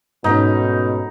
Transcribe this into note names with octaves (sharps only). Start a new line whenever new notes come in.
G#2 B2 A3 C#4 D#4